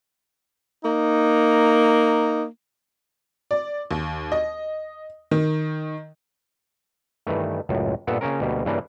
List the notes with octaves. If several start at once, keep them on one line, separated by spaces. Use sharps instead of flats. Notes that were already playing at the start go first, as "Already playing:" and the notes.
A#3 D#4
D5
D#2
D#5
D#3
G2 D#3 E3 A3
C#2 F#2 A2
G2 A#2 B3 A4 E5 F#5
C#3 A#3 C4 C#4 F4 A#4
D2 B2 G3 A#3
G2 C#3 E3 G3 A#3 D4